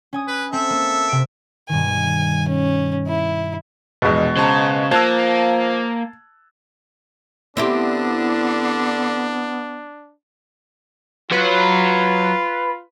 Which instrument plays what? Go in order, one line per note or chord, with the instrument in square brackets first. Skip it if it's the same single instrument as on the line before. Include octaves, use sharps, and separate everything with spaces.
[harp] C#4 G#5 D#6
[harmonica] B4
[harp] C4 [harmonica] A4 E5
[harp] A#3
C3 D7
[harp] G2 B2 D#3 [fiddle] G#5
[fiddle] C#4
E4
[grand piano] A#1 E2 [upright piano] B2 G#3
[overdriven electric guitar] C#3 [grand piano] C5 A5 A#5
[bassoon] F3 [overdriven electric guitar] A#3 [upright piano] A5 [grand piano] E6 F#6 G#6
[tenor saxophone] D3 [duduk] B3 [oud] C4 E4 G4 [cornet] D4
[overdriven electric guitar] F#3 C#5 [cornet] F4 [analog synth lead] B4